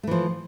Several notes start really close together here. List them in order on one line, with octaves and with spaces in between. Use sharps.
A3 E3 F3